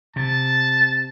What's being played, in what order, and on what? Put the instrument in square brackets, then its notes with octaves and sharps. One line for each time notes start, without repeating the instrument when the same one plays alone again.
[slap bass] C3 [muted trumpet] A5